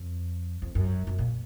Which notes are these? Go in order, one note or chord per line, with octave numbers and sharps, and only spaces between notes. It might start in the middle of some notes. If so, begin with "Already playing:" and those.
Already playing: F2
F2
F#2
F#2
A#2